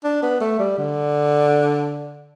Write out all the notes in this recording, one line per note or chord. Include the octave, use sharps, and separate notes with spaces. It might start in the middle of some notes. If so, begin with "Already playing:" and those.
D4
B3
A3
G3
D3